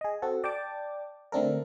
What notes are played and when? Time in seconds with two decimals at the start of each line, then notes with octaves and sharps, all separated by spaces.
0.01 G#4 D#5
0.22 C4 F#4 A4
0.44 D5 G5 A5 D6
1.32 D3 A3 C4 D4 A4 A#4